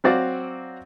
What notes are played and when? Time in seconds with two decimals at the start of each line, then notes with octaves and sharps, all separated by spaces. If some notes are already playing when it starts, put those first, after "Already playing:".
0.04 F#3 C4 F#4 D5 F5